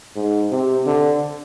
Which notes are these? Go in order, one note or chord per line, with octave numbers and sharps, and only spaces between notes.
G#2
C3
D3